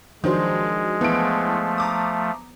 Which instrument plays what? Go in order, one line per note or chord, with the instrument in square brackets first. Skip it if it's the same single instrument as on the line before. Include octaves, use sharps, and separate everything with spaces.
[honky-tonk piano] D#3 F#3 [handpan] F3 D4 C5 [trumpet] G#3
[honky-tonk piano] E3 D7 [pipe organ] F3 A3 [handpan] B3
[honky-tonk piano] A#5 D6 D#6